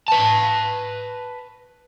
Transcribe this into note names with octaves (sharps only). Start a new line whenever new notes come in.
B4 A5